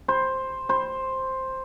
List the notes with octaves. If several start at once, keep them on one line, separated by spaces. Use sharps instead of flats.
C5
C5